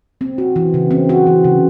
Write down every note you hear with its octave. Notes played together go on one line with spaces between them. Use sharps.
C4
F#4
E3
C#3
C4
F#4
E3
C#3